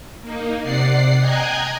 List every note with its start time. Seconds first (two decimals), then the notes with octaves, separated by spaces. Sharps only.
0.22 A#3 D#4
0.63 C3 D5 F#5 C7
1.20 D#5 G5 G#5 A#5 F#6 G#6